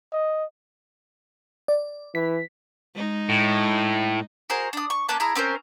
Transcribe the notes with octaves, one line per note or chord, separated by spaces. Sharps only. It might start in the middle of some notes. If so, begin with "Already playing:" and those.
D#5
D5
E3 B6
G#3 D#4
A2
F#4 G#4 A#4 C5
D4 D#6
C#6
A#3 C#4 A5 F#6
E4 G#4 A#5
C4 C#4 A#4 C5